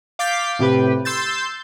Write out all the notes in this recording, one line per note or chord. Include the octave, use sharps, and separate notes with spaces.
F5 D6 G6 A6 B6 C7
A2 C3 G4 B4
C6 E6 G6 A6